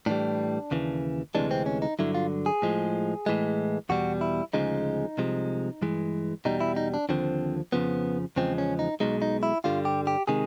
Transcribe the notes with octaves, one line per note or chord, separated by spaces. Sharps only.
A2 E3 G3 D4
D#2 C#3 E3
D2 C3 E3 G#3 D4
C4
C#4
D#4
G2 D3 F#3 E4
F4
G#4
A2 F3 G#3
A2 E3 G#3
E2 B2 G3 F#4
E4
D2 C#3 F3 G#3 D#4
C2 C3 F3 G#3
G2 E3 G#3
E2 B2 G3 D#4
E4
D#4
D4
D#2 D3 F3 C4
F2 C#3 F3 B3
E2 C#3 F3 G#3 C4
C#4
D#4
B1 B2 G#3 D#4
D#4
E4
G2 D3 G3 F4
G4
G4
C3 D#3 G#3 G#4